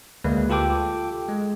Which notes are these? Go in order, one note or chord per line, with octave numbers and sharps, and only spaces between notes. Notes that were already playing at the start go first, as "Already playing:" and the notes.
D2 G#3 A#3 B4
F4 G4 A4 G5 D6
G#3